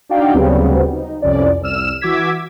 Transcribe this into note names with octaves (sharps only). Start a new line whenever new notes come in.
D4 D#4 F#4 D5 F5 G5
D2 C#3 F#3 G3 B3 C4
D#4
C2 F2 C#4 D5
C2 E6 F6 E7
E3 F#4 D6 E6 G#6 B6